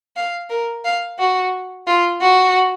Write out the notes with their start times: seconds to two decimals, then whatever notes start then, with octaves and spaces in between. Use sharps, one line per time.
0.16 F5
0.50 A#4
0.85 F5
1.19 F#4
1.87 F4
2.21 F#4